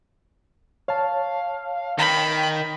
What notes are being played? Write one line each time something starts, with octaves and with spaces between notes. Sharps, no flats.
C#5 F5 A5
D#3 G5 B5